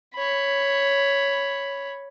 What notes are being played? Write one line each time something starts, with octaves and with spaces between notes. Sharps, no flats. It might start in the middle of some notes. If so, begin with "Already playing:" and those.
C#5 B5